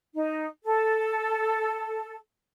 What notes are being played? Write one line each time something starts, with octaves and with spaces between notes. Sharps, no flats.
D#4
A4